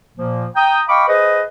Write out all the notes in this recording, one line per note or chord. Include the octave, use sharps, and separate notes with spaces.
A#2 F3 A#3
G5 A#5 D#6
D#5 F5 G5 B5 C#6 D6
G#4 B4 C5 D#5